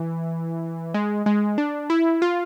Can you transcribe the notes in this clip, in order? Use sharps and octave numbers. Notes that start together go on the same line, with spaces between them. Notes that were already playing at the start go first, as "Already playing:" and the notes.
Already playing: E3
G#3
G#3
D4
E4
F4